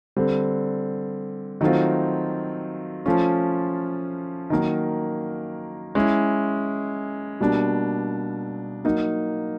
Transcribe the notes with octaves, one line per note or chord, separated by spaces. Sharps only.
D3 G3 C4
D#3 F#3 A3 C4 F4
F3 A3 C#4 F4
D#3 F#3 A#3
G#3 C#4 E4
B2 G3 A#3 D4
F#3 A#3 D#4